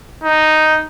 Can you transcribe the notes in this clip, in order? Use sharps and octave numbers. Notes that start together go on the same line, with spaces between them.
D#4